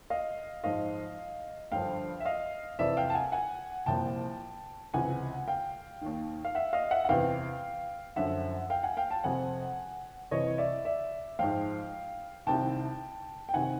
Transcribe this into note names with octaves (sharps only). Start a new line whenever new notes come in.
D#5 F5
G#2 F3 D#5 F5
G2 D3 F3 F5 G5
E5
D#5 F5
F2 C3 E3 D5 E5
F5 G5
A5
F#5 G#5
F#5 G#5
C2 A#2 F3 G5 A5
C#2 C3 E3 F#5 G#5
F5 G5
D#2 D#3
F5
E5 F#5
D#5 F5
E5 F#5
F#5
E2 C3 E3 F5 G5
F#2 D3 F3 E5 F#5
F5 G5
F#5 G#5
F5 G5
G5 A5
F2 C3 F3 F#5 G#5
C2 C3 E3 C#5 D#5
D5 E5
D5 E5
G#2 F3 F5 G5
C2 C3 D#3 G5 A5
G5
C3 D#3 F#5 G#5